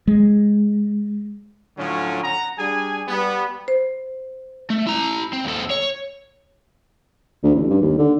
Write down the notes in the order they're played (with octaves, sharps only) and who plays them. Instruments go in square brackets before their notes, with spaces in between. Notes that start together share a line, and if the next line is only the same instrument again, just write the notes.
[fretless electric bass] G#3
[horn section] A2 D3 F3 F#3 C#4
F#5 A#5
G3 D4 G#4 G#5
G3 B3
[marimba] C5
[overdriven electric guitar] A3
E4 A#5
C4
D#2 A4
C#5
[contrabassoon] D2
A1
G2
D#2
D3